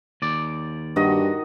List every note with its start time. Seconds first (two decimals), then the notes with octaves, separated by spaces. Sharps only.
0.22 D#2 D5
0.96 G2 D#3 F#4 D#5